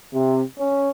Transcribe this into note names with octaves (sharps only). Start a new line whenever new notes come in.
C3
C#4